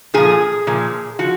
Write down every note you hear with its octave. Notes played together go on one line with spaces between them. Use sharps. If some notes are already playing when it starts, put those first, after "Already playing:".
A#2 F3 G#4
A#2 F3
F3 F#4